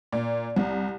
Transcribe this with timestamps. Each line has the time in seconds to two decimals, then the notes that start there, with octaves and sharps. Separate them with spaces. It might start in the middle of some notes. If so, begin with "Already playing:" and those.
0.12 A#2
0.56 C2